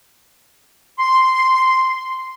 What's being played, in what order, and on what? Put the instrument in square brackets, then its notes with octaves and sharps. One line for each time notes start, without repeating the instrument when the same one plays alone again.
[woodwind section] C6